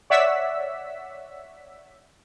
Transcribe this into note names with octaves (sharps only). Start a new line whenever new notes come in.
C#5 D5 E5 F#5 E6 B6